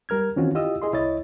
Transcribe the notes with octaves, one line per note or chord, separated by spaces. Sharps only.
G3 A#4 F6 G#6
D#3 E3 C4 C#4 F4 F#4
E4 F4 G4 D#5 D#6 E6
E4 G#4 D#5 C6
C2 E4 C#5 D#5 A6